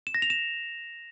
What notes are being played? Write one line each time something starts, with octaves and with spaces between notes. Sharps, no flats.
E7
A#6
F7
E7